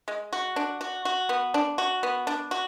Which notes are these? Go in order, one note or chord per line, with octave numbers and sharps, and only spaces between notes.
G#3
F#4
D4
F#4
F#4
B3
D4
F#4
B3
D4
F#4